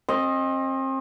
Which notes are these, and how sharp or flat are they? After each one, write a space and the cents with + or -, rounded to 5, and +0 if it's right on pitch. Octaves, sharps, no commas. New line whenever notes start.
C4 +35 D#5 +0